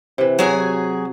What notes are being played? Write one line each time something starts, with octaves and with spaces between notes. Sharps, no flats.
C3 E3
F#3 F#4 G#4 G#5